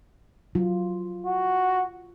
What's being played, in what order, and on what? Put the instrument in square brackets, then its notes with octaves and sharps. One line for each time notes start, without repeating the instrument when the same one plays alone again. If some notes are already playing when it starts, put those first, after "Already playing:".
[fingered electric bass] F#3 [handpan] F4
[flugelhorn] F#4